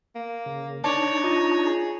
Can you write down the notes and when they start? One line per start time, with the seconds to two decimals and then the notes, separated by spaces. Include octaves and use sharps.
0.15 A#3
0.46 C#3
0.84 D4 D#4 C#5 D5 A5
1.24 F4 D#5
1.65 G#4